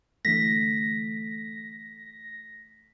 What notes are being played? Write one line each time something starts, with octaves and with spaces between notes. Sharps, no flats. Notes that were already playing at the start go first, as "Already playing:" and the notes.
D3 E3 A3 A#6 B6